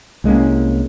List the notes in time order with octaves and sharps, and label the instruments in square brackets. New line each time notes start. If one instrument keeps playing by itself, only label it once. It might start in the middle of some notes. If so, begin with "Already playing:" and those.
[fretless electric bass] C2 G#3 A#3 C#4